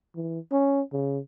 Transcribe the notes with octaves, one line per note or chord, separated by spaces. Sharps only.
E3
C#4
C#3